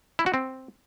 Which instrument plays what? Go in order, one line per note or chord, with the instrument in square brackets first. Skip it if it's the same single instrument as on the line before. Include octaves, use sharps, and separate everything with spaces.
[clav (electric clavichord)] E4
F#4
C4